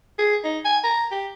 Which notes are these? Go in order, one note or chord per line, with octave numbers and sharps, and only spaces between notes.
G#4
D#4
G#5
A#5
G4